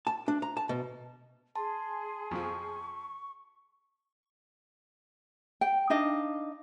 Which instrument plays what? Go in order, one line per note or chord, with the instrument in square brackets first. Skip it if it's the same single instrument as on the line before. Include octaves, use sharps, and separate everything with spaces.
[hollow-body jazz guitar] A5
D4
A#5
A5
B2
[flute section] G#4 [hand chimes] A5 [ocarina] C6
[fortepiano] F2 F3 [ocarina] C#6
[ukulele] G5
D4 D#4 D#5 F5